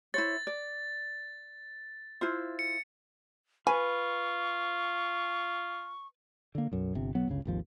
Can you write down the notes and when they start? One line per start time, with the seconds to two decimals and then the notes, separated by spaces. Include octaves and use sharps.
0.14 E4 C5 C#5 A6
0.47 D5
2.21 E4 F4 C5
2.59 C#7
3.67 F4 B4 G#5 C#6
6.55 D3 A#3
6.72 B1 F#2
6.95 G1 C3
7.15 B1 F#3 B3
7.28 G1 C#2 C#3
7.45 G#1 D#2 F3